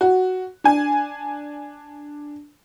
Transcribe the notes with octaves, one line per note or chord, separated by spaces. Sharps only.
F#4
D4 G#5